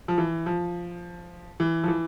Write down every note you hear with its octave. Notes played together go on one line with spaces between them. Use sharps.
F3
E3
F3
E3
F3
E3